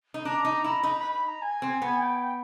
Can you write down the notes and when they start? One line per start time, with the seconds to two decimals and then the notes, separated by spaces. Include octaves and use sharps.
0.14 D#4
0.24 D4 A#5
0.45 D#4
0.64 E4
0.83 D#4 B5
0.99 B5
1.13 B5
1.28 A#5
1.42 G#5
1.62 C4
1.82 B3
2.01 G5